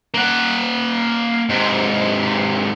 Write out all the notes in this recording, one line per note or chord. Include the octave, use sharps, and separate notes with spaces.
A#3 F#5
G#2 C3